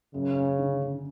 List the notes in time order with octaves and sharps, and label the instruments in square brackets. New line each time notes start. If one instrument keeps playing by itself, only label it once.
[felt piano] F#2 [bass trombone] C#3
[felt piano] C#4
D3
D3